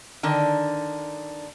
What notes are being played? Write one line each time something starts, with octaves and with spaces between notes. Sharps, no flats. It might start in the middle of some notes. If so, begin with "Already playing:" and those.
D3 D#3